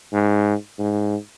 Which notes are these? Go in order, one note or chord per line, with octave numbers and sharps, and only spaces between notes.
G#2
G#2